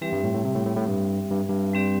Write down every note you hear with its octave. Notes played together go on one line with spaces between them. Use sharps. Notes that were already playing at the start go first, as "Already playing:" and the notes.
E3 G3 C4 G4 E5
G2
A2
A2
C3
A2
A2
A2
G2
G2
G2
G3 C4 G4 D5